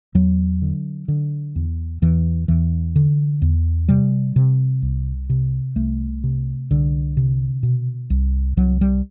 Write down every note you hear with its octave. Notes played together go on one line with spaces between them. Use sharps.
E2 F#3
D3
D3
E2
E2 E3
E2 E3
D3
E2
C3 G3
C3
C2
C3
C2 A3
C3
C2 D3
C3
B2
C2
C2 F#3
G3